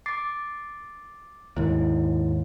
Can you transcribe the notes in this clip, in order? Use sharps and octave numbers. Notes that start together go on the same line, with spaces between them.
D6 A6 C7
D#2 G#2 E4